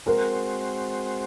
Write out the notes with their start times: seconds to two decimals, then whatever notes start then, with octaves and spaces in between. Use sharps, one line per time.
0.06 G#3 C4 F#4 A#4 C5